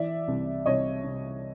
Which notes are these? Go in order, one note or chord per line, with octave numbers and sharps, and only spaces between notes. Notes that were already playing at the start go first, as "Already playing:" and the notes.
Already playing: E3 D5 E5
C2
C2 C#5 D#5
C3